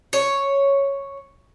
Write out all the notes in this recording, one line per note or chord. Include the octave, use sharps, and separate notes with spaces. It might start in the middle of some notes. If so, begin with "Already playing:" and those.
C#5